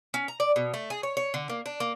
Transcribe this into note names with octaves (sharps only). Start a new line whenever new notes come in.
C#4
A#5
D5
B2
A3
G#4
C#5
C#5
D3
A#3
D4
A#3